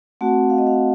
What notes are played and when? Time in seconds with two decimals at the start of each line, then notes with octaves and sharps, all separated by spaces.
0.21 A3 C4 F#4 F#5
0.50 F5
0.58 D#5
0.67 F5